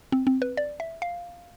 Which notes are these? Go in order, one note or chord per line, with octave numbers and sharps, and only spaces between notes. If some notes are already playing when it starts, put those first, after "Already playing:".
C4
C4
B4
D5
E5
F5